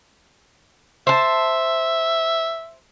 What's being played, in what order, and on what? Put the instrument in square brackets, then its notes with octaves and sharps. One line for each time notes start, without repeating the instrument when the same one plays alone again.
[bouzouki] C5 A5 [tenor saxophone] E5